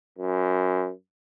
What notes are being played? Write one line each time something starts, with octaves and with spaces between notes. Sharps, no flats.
F#2